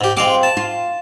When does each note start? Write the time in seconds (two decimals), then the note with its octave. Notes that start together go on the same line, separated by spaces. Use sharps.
0.01 G#2 G4
0.17 G#3 C4 F4 F5 D6
0.43 A5
0.57 F4